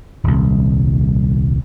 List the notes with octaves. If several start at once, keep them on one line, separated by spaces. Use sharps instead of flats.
D#1 C2